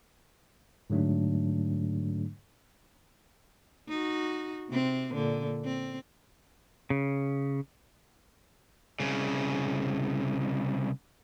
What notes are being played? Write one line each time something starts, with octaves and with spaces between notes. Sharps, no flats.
G#2 D3 F#3 A3 D4
D#4 F#4
C3 C4
A#2 D3
C4
C#3
C2 C#3